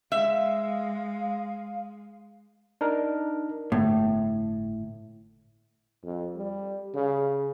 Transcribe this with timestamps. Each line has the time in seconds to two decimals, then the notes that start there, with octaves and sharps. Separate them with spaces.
0.12 G#3 E5 F5
2.81 D4 D#4 A#4
3.72 G1 A2
6.03 F2
6.36 G3
6.94 C#3